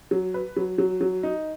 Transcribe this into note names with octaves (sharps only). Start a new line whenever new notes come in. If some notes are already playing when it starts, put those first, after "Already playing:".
F#3
B4
F#3
F#3
F#3
D#4